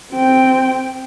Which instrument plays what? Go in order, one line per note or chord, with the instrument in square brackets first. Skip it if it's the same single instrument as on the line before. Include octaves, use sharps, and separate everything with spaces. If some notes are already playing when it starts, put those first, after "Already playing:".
[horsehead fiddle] C4 G5